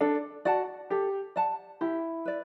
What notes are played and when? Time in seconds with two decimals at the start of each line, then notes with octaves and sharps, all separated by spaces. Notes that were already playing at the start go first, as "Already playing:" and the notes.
0.01 D4 A4
0.45 F#4 D5 F#5 A5
0.90 G4 A4
1.36 D5 F#5 A5
1.81 E4 G4
2.25 B4 D5